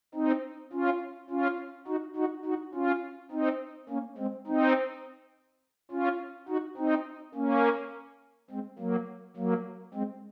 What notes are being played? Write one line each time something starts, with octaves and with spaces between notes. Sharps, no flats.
C4 D#4
C#4 F4
C#4 F4
D#4 F#4
D#4 F#4
D#4 F#4
C#4 F4
C4 D#4
A#3 C#4
G#3 C4
C4 D#4
C#4 F4
D#4 F#4
C4 D#4
A#3 C#4
G#3 C4
F#3 A#3
F#3 A#3
G#3 C4